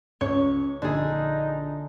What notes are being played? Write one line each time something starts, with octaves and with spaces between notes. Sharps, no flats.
C#2 C#5
A#1 D3 D#4 G#4